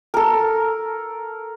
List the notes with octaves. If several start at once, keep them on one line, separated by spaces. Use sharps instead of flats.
A4 A#4